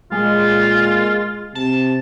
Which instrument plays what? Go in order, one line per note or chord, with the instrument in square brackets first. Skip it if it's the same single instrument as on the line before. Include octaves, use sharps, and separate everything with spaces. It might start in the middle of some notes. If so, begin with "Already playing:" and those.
[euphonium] A#2 [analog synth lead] G#3 [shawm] F4
[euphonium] C3 [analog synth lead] A5